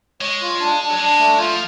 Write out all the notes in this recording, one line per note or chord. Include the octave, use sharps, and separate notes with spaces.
G#3 C#5
F4
D4
D4
F#3
G#3 D4
A3
F3 F4